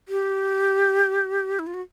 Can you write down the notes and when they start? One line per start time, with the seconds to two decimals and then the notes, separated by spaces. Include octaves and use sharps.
0.09 G4
1.59 E4
1.67 F4
1.74 F#4